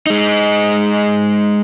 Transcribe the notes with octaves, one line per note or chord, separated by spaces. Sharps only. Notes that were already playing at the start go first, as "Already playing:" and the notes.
G#3 D#4